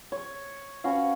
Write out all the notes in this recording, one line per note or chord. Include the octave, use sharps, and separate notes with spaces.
C#5
C#4 F#4 B4 F5